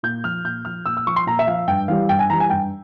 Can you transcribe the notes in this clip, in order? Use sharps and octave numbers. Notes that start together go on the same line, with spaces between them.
A#2 G6
F3 F6
A#2 G6
F3 F6
A#2 E6
E6
F3 C#6
C6
A#2 A#5
E5
F3 F5
G2 G5
E3 G3 F5
G2 G5
G#5
E3 G3 A#5
G#5
G2 G5